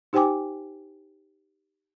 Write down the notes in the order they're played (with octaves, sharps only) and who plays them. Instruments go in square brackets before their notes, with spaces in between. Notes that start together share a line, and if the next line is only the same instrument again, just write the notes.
[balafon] D#4 G4 C5 G5 G#5 D6